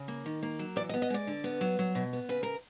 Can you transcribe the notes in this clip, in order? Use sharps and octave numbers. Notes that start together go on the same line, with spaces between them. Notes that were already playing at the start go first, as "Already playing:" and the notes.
Already playing: C#3
A#3
D#3
A#3
F#3
E3 D5
D#5
B3
D#5
G#3 D5
D3
B3
F#3
F#3
B2
B3
C#3 B4
A#4